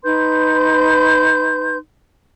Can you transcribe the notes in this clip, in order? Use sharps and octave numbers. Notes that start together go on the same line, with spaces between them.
D#4 B4 C6 G6